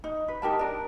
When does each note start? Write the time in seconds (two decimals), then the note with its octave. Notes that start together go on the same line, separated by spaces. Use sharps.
0.04 D#4
0.28 B4
0.42 D#4 G4 A#4 A5
0.59 D4 A#4